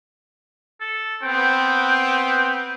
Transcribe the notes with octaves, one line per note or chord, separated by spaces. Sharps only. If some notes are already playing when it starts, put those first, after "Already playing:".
A4
B3 C4 G5